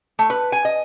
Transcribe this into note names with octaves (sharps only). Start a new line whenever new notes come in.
A3
B4
G#5
D#5